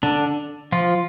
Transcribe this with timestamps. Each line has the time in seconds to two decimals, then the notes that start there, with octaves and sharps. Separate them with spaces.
0.03 D3 D4
0.72 F3 F4